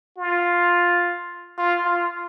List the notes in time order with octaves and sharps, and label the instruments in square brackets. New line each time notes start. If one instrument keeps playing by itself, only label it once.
[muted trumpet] F4
F4
F4